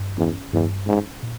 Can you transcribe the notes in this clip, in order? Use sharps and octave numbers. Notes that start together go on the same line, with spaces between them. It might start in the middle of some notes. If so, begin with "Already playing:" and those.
Already playing: G2
E2 C#4
E2 G2
G#2 C#4
A#2